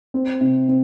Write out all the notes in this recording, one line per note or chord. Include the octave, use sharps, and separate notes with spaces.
C4
C3
C4